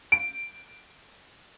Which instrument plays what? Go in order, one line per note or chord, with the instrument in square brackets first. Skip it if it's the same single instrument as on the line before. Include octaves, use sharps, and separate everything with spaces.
[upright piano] D7